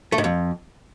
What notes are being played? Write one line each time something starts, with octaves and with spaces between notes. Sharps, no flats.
A3
G#2
F2